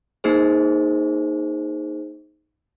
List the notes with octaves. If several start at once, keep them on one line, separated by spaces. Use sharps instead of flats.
A#3 D#4 G#4 C5